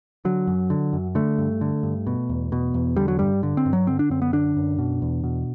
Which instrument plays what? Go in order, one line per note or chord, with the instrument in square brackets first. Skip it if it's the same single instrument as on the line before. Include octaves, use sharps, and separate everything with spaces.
[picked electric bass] D3 F#3
F#2
D3
F#2
D3 A3
G2
D3
G2
B2
E2
B2
E2
D3 G3
F#3
G2 G3
D3
C4
G2
F#3
D3 C4
D4
F#2 C4
B3
D3 D4
F#2
B2
E2
B2